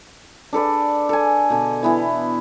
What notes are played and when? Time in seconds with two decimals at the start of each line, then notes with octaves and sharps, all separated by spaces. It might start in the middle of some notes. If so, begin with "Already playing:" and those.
0.53 D4 A4 B4 D5
1.09 A4 G#5
1.50 B2 D3
1.83 E3 B3 E4